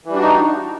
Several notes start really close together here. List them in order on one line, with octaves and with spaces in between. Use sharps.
E3 G3 D4 F#4 D#4